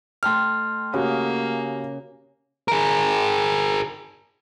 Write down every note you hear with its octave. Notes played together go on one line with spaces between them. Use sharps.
A3 G5 A5 C6 F6
C#3 A#3 F#4 G4
G#4 A#4